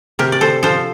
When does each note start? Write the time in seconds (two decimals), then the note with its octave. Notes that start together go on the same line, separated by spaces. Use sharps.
0.19 C3 G4 A#4
0.32 D5
0.41 A4 C5
0.63 F3 A4 C5